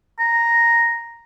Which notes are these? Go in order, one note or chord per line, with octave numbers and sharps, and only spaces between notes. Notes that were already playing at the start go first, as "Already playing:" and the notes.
A#5